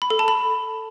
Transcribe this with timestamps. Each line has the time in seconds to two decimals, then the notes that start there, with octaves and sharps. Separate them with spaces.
0.02 B5
0.10 A4
0.19 A5
0.28 B5